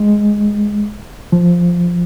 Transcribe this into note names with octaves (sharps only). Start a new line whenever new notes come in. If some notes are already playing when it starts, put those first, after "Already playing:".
Already playing: G#3
F3